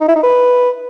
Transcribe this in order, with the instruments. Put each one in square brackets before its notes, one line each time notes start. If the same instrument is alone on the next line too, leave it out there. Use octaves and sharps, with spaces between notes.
[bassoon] D#4
E4
D#4
B4